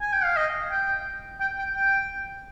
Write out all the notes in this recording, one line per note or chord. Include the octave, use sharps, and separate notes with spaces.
G#5
G5
F5
D#5
G5
G5
G5
G5